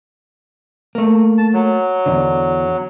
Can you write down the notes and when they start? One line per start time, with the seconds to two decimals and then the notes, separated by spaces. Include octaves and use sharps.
0.95 A3 A#3
1.38 A5
1.53 F#3
2.06 E2 G#2 D3